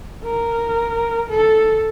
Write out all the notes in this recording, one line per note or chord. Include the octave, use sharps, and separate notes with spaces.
A#4
A4